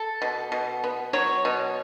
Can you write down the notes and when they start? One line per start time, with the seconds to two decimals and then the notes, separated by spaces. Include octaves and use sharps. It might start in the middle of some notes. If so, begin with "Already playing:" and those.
Already playing: A4
0.22 B2
0.52 B2
0.84 B3
1.13 F#3 C#5
1.45 B2